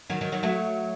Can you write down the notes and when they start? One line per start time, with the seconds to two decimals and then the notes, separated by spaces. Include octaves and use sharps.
0.10 D#3 F#3
0.21 D#3 F#3
0.32 D#3 F#3
0.43 F#3 A3